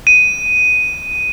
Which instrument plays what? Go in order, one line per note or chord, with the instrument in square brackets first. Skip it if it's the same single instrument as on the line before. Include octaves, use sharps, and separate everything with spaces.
[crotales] D#7